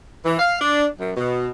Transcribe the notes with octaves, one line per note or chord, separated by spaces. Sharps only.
E3
F5
D4
F#2
B2